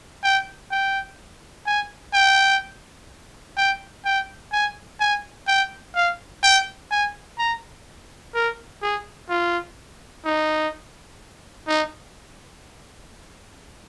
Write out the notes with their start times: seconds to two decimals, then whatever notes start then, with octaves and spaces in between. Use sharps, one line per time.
0.24 G5
0.71 G5
1.66 G#5
2.14 G5
3.57 G5
4.05 G5
4.52 G#5
5.00 G#5
5.48 G5
5.95 F5
6.44 G5
6.91 G#5
7.39 A#5
8.35 A#4
8.82 G#4
9.29 F4
10.25 D#4
11.68 D#4